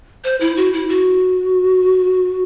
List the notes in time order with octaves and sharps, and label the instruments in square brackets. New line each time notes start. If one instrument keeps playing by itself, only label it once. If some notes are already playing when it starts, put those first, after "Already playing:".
[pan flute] C5
E4
F#4
E4
F#4